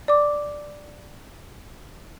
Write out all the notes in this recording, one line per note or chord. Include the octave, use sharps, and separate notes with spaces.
D5 D6